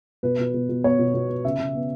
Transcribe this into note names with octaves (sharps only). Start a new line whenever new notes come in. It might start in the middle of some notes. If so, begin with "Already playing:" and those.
B2 B4
B2
B2
B2
B3 C#5
B2
B2
B3
C#3 E5
C#3
B3